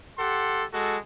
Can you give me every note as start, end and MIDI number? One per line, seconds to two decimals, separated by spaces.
0.18 0.64 67
0.18 0.64 69
0.18 0.64 78
0.18 0.64 84
0.73 0.96 56
0.73 0.96 66
0.73 0.96 69